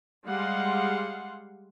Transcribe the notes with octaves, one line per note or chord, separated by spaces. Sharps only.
G3 G#3 F5 F#5 C6